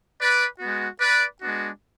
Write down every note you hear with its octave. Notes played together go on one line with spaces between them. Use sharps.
B4 D5
G#3 B3 F#4
B4 D5
G#3 B3 D4 F#4